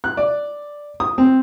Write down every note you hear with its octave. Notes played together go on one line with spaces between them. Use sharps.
F#6
D5
D#6
C4